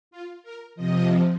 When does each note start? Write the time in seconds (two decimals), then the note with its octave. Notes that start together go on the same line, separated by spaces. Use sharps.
0.11 F4
0.43 A#4
0.75 C3 F3 D#5